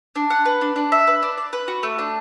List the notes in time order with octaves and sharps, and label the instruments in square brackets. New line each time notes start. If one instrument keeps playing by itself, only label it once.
[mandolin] D4
F#5
B4
D4
D4
E5
B4
D4
D5
B4
F#4
A3
D4